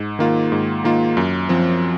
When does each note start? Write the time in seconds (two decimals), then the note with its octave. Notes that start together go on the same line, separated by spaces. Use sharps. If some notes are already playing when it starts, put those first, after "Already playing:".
Already playing: G#2
0.19 D#3 A#3 F4
0.52 G#2
0.84 D#3 A#3 F4
1.17 F#2
1.49 F3 C4